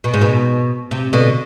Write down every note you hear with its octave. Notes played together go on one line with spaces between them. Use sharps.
B2
G#2
B2
C3
B2 D3